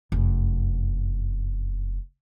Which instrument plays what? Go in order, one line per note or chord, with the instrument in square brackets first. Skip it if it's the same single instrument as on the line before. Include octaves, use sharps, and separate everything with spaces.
[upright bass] F1 F#2